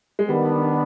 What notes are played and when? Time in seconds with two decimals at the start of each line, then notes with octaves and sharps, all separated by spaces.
0.19 G#3
0.29 D#3 G3 B3 D4